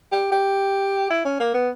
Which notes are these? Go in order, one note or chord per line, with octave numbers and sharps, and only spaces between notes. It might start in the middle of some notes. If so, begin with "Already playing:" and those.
G4
G4
E4
C#4
A#3
B3